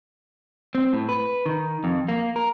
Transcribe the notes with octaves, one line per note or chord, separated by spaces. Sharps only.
C4
A2
B4
D#3
F2
A#3
A#4